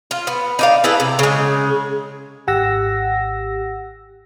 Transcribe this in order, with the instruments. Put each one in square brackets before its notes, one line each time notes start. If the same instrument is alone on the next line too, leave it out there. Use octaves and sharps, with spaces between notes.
[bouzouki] F4
B3
D#4 D5 F5
E4 G#4 A4 B4
C3
C#3 G#3
[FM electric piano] G#1 G4 F#5 E6 A#6